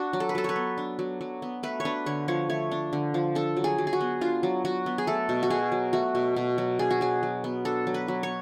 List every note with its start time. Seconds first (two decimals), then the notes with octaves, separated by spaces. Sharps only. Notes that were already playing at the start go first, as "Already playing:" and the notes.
Already playing: D4 F#4
0.13 F#3
0.20 A4
0.29 B4
0.35 F#3 A4
0.44 B4 C#5
0.56 B3
0.78 D4
0.99 F#3
1.21 F#3
1.42 B3
1.63 A3 B4
1.80 C#5
1.85 D4 B4
2.06 D3 C#5
2.28 F3 C#5
2.50 A3 C#5
2.71 D4
2.93 D3
3.14 F3
3.35 D4 A4
3.57 F#3
3.64 G#4
3.78 F#3
3.87 G#4
3.93 F#4
4.01 B3
4.21 D4 F4
4.43 F#3
4.65 F#3 F#4
4.86 B3
4.98 G#4
5.07 A3 A4
5.29 B2
5.43 F#4
5.50 B2 G#4
5.72 F#3
5.93 A3 F#4
6.15 B2
6.36 B2
6.58 F#3
6.79 D4 G#4
6.91 F#4
7.01 F#3 G#4
7.23 F#3
7.44 B3
7.65 D4 A4
7.87 F#3
7.94 B4
8.08 F#3
8.23 C#5